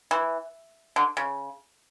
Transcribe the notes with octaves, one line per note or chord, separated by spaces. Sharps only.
E3
D3
C#3